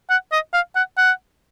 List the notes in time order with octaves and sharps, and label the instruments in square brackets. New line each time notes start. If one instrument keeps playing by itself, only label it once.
[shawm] F#5
D#5
F5
F#5
F#5